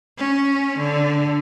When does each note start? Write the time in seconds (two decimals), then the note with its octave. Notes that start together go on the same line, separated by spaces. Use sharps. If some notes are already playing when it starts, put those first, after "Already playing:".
0.18 C#4
0.78 D3